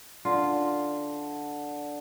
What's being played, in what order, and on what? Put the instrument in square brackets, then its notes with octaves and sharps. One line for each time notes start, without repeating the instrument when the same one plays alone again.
[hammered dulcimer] D3 [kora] F4